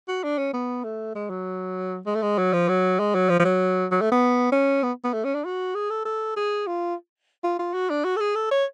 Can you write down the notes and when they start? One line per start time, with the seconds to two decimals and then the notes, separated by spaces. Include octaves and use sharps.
0.08 F#4
0.23 D4
0.38 C#4
0.53 B3
0.84 A3
1.15 G#3
1.30 F#3
2.06 G#3
2.15 A3
2.22 G#3
2.38 F#3
2.53 F3
2.68 F#3
2.99 G#3
3.15 F#3
3.29 F3
3.40 F3
3.44 F#3
3.92 F#3
4.01 A3
4.12 B3
4.52 C#4
4.83 B3
5.04 B3
5.13 A3
5.24 C#4
5.35 D4
5.45 F#4
5.75 G#4
5.90 A4
6.05 A4
6.36 G#4
6.67 F4
7.43 F4
7.59 F4
7.74 F#4
7.90 D4
8.04 F#4
8.16 A4
8.21 G#4
8.35 A4
8.51 C#5